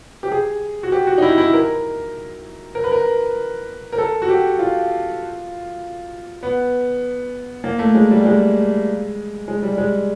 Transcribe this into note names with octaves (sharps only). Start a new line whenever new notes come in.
G4
G#4
F#4
G4
F#4
D#4
E4
E4
A#4
A#4
B4
A#4
A#4
A4
F#4
G4
F4
B3
A#3
A3
G#3
G3
G#3
G#3
G3
G#3